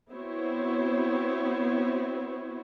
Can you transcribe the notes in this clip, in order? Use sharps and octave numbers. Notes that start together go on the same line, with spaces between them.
B3 C4 E4 F#4 C5 C#5